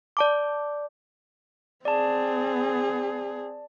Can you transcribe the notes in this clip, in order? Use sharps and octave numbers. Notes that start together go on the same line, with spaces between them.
D5 A5 D6
C4 G#4 D5 A5